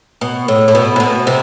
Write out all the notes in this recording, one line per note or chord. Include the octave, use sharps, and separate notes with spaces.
B2
A2
A2
B2
C3
B2
C3